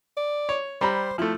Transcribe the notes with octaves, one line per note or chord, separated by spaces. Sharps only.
D5
C#5
G3 C5 A#5 B5
F3 A3 E4